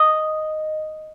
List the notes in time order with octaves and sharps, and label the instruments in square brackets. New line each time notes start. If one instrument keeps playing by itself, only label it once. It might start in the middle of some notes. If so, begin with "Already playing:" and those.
Already playing: [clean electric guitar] D#5